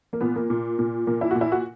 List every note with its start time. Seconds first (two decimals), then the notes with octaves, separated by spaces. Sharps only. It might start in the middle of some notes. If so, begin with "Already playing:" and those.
0.13 A#3
0.21 A#2 B3
0.36 A#3
0.50 A#2
0.79 A#2
1.07 A#2 A#3
1.21 E4
1.31 A#2 F#4
1.41 E4
1.52 F#4